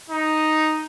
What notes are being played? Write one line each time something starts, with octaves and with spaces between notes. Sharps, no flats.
D#4